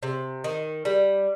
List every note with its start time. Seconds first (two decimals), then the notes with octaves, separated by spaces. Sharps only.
0.03 C3
0.44 D#3
0.85 G3